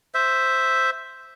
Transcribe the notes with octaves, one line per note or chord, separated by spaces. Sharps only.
C5 E5